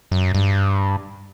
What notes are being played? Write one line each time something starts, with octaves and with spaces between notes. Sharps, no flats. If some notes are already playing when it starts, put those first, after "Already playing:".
F#2
G2